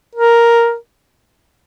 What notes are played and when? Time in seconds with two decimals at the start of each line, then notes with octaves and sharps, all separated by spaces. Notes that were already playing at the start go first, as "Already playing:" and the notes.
0.15 A#4